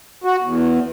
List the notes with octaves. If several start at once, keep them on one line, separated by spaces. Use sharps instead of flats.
F#4
E2